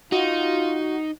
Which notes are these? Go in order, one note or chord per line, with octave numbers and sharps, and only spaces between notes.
D#4 F4 F#4